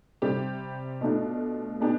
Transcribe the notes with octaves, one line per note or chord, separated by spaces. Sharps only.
C3 G3 C4 G4
B2 A3 D4 F4
B2 B3 D4 G4